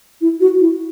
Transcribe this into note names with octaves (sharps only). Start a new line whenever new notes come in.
E4
F#4
E4